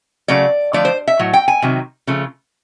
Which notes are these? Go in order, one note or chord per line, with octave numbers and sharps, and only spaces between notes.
C#3 F#3 A3 D5
D3 F3 A3 D5
C5
E5
A2 F#3
G5
G#5
C3 D#3 F#3
C#3 F3 A3